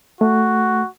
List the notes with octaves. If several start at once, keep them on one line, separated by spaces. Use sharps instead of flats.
A3 F#4